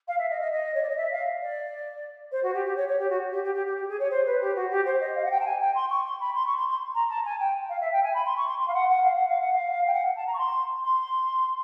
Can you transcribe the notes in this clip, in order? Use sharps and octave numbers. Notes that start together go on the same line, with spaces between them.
F5
E5
D#5
D#5
D#5
C#5
D5
D#5
E5
F5
D5
C5
F#4
G4
G4
C#5
C#5
G4
F#4
G4
G4
G4
G4
G4
G#4
C#5
C5
B4
G4
F#4
G4
C5
D#5
F5
F#5
G5
A5
G#5
G5
C6
C#6
C6
B5
C6
C#6
C6
C6
A#5
A5
G#5
G5
F5
E5
G5
G#5
B5
C6
C#6
C6
C6
F5
F#5
F#5
F5
F#5
F5
F#5
F5
G5
F#5
A5
A#5
C#6
C6
C6